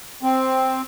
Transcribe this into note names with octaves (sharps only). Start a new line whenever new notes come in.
C4